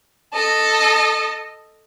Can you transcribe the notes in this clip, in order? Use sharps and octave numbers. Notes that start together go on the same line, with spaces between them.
A4 D#5